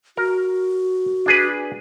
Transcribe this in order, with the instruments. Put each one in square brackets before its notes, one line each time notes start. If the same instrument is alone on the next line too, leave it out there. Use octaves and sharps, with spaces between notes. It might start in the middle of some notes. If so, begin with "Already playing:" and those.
[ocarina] F#4 [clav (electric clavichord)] A#4
[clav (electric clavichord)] D4 G#4 B4